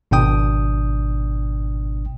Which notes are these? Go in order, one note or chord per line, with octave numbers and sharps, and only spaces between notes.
G#1 B2 D4 G5 D#6